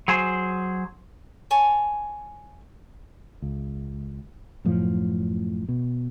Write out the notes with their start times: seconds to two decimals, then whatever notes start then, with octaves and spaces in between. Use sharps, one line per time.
0.08 F#3 G#4 C5
1.51 C#5 G#5 A5
3.42 C#2
4.65 F#2 A2 F3
5.69 B2